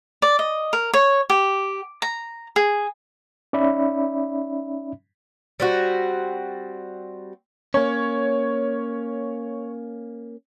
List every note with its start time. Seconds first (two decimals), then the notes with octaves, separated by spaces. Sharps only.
0.22 D5
0.39 D#5
0.73 A#4
0.93 C#5
1.30 G4
2.02 A#5
2.56 G#4
3.53 C#4 D#4 D5 E5 B5
5.60 G3 C4 F#4
7.74 A#3 C#4 C#5